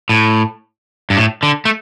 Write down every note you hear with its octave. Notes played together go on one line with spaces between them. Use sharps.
A2
G2
A2
D3
A3